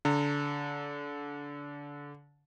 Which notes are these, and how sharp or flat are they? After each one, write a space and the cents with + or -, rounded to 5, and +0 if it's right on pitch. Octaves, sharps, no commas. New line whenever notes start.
D3 -25 A#5 -40